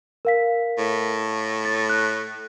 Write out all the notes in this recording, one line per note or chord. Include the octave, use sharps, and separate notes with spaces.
A#4 F5 B6
A2
A6
F#6